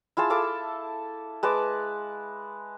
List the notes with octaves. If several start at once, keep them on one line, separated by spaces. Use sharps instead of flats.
E4 F4 G#4 A5
E4 A4 F5 D6
G#3 B4 A5 D6